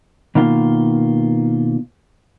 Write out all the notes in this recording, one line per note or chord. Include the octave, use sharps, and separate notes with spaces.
B2 D#3 A#3 F4